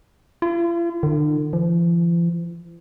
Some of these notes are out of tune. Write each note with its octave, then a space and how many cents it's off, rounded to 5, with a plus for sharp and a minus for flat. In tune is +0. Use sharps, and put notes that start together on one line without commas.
F4 -45
D3 +40
F3 -45